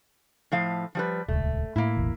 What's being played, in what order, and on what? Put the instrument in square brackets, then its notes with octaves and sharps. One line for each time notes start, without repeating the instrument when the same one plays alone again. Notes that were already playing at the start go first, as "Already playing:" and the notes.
[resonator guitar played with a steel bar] A2 F3 F5
F3 G3 B4
[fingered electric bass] D#1 C#2 [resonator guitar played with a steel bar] A3
[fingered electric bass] A2 [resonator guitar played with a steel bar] A#3 E4
[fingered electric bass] E1 A1